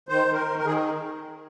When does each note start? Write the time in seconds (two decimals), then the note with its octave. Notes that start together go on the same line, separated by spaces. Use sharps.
0.09 D#3 C5
0.27 D#3
0.33 A#4
0.46 D#3
0.59 A#4
0.64 D#3 G#4